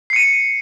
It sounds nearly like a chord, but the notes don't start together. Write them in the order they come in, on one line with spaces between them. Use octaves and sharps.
C7 C#7 D#7